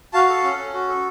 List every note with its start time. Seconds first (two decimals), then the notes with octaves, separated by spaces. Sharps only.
0.13 F#4 F5 A5
0.29 A4
0.44 C#4
0.58 C#4
0.73 F#4
0.89 A4